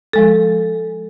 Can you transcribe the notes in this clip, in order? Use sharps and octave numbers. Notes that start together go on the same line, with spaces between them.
F3 G#3 A4